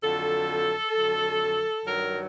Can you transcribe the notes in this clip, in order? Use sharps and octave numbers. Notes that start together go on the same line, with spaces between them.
F2 D3 F#3 A4
F2 D3 F#3
G2 D#3 F#3 A#4